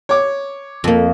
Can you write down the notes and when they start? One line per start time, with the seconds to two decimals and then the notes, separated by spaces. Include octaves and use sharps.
0.09 C#5 D6
0.84 F2 A#3